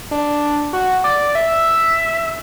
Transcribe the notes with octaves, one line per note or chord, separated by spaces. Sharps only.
D4
F#4
D5
D5
E5